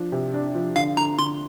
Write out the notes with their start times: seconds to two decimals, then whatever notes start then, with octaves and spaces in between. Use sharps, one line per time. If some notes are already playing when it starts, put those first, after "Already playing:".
Already playing: F3 D4
0.12 C3
0.34 D4
0.55 F3
0.76 D3 F5
0.97 D3 A#5
1.18 D3 C6